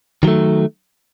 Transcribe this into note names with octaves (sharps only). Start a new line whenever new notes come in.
D#3 F#3 A3